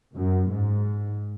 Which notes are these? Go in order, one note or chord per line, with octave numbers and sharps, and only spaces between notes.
F#2
G#2